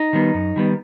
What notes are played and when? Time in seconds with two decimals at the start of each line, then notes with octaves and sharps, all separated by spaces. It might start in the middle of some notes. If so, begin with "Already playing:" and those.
Already playing: D#4
0.13 D#3 G3 B3
0.34 F#2
0.56 D#3 G3 B3